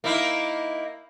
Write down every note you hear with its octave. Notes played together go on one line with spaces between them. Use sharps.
A#3 D#4 E4